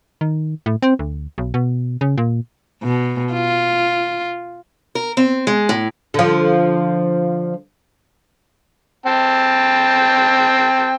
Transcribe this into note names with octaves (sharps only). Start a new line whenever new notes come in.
D#3
A2
C4
D2
B1
B2
C#3
A#2
B2
F4
A#4
C4
G#3
A2
D3 F3
C4 G5 A5